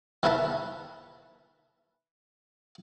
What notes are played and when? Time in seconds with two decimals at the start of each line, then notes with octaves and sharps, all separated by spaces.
0.23 D#3 E4 B4 E5 A5